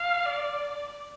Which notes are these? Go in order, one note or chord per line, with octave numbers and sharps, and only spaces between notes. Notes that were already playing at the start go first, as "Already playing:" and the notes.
Already playing: F5
D5